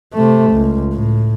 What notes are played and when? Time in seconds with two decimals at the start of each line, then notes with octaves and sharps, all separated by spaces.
0.14 C3 A3
0.51 C#2
0.93 A2